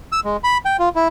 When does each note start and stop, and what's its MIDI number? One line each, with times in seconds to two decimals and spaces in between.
0.12 0.20 88
0.24 0.37 56
0.44 0.58 83
0.65 0.77 79
0.79 0.89 65
0.95 1.08 64